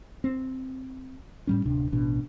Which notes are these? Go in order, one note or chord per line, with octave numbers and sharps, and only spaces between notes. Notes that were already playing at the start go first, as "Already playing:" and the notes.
C4
A2 G3 C#4
D1 C3 D4
A1 B2 D4